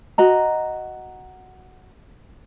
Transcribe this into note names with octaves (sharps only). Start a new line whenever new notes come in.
F#4 D#5 A#5